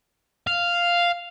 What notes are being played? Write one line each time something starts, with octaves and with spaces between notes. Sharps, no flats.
F5